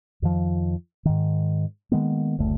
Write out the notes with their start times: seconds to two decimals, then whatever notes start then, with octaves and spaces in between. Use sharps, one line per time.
0.22 F2 D#3 F3
1.05 G#2 D#3
1.92 D#3 G#3 A#3 B3
2.39 F#1 D2 A3